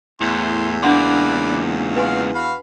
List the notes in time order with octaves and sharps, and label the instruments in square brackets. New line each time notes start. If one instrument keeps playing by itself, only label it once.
[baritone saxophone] E2 [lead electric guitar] A2 [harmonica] C6
[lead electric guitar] C#2 A#3 [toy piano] D4 F#5 C6 [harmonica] B4 D5
[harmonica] F#4 F5 [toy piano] B4 G#5 C6
[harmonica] F#4 F5 B5